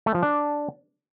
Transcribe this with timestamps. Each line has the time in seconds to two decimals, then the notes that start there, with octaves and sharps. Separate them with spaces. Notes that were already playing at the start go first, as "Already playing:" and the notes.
0.06 A3
0.14 F3
0.23 D4